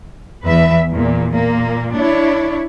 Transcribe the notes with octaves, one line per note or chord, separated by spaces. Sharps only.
E2 E3 B4 E5
E2 A#2
A#2 A#3
D4 E4 C#5